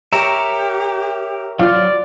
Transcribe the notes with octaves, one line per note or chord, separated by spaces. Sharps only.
G4 A#4 C#5 E5 A#5
F#3 F4 D5 F5 F6